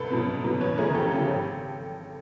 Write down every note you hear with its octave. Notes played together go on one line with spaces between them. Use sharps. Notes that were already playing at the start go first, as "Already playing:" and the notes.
Already playing: C2 A4 B4
B2 F#3 B3
C2
B2 F#3 B3
E2 B4 C#5
C#3 F3 A3 G#4 A#4
E2 G4 A4
C#3 F3 A3 G4 A4
G#1 G4 A4